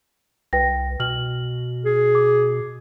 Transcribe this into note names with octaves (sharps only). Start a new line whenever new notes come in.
C2 B4 G5 A#6
B2 F6 F#7
G#4
D6